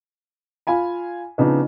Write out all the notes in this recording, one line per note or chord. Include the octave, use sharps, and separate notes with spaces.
F4 F5 G#5 B5
C#3 F3 B3 D4 D#4